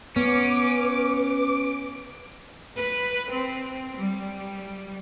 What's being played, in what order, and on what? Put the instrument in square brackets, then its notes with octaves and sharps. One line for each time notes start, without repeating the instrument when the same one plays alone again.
[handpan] B3 [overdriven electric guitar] C#4 [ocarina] B4 [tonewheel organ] D6
[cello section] B4
C4
G3